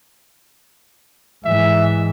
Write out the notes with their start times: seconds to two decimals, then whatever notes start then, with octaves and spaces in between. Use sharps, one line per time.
1.45 G#2 E3 E5